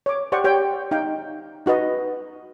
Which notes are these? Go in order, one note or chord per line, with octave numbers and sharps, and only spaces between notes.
C#5 D6
G4 C5 D5 F#5 G5 C#6
G4 C5 C#5 G5
D#4 F5 G5
D#4 F#4 B4 D#5